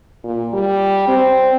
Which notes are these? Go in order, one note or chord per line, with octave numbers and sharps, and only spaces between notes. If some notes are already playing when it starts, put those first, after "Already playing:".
A#2
G3
C4